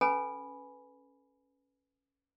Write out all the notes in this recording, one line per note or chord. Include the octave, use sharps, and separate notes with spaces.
C#4 A4 B4 G#5 B5